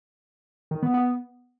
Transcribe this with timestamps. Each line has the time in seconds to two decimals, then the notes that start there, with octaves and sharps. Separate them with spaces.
0.71 D#3
0.83 B3
0.94 B3